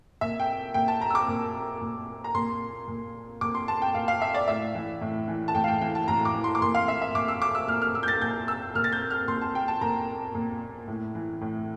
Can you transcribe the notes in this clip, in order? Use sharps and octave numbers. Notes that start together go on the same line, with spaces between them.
A#2 E5
G5
A#2 G5
A5
A#5
E6
D6
A#2
A#2
A#5
A#2 C6
A#2
A#2 D6
C6
A5
G5
A#2 F5
F5
E5
D5
A2 E5
E3
A2
E3
A5
A2 G5
F5
G5
E3 G5
A5
A2 A#5
D6
E3
C6
D6
A#2 C6
F5
E5
E5
A#2 D6
E6
D6
E6
A#2 F6
F6
E6
G6
A6
A#2 G6
E6
A#2 F6
A6
G6
F6
A#2 C6
A5
G5
A5
A#2 A#5
A#2
A2
E3
A2